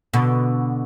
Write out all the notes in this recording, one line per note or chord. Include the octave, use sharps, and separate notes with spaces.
B2 D3